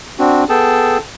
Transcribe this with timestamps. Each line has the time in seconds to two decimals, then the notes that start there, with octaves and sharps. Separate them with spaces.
0.19 C4 D4 F#4
0.49 B3 G#4 A4 G5 A5